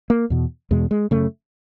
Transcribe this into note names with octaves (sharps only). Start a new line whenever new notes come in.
A#3
E2 B2
E2 B2 G#3
G#3
F#2 C#3 A3